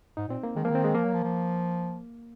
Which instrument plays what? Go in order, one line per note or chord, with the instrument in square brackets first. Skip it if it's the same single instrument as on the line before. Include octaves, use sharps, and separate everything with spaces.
[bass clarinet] G#2 [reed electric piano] D#4
[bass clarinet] A#2 [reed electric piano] C4
[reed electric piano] A#3
[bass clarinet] D#3 [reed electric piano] G#3
[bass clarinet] F3 [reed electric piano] A#3
[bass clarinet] D#3
[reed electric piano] C4
G#3
[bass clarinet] F3 [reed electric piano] A#3
[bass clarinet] F#3
F3
F3